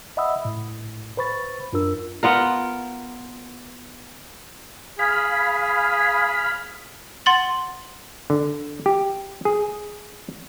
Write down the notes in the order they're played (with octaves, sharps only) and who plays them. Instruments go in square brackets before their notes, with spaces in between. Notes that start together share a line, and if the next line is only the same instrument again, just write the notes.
[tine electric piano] D#5 E5 F#5 B5 D#6 E6
A2
B4 C5 B5 C#6 A6
F#2 D4 F4 A#4 E6
[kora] B3 F4 A#4
[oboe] G#4 [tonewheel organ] F5 B5
[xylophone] F#5 C6 A6 F#7
[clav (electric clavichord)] D3
G4
G#4